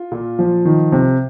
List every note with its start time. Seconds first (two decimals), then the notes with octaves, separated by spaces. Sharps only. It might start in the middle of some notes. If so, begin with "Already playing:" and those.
Already playing: F4
0.12 A#2
0.39 F3
0.65 D#3
0.92 C3